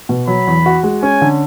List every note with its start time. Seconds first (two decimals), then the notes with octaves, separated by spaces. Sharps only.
0.09 B2
0.27 F#3 B5
0.47 E2
0.66 F#4
0.83 G#3
1.03 C#4 G#5
1.22 D3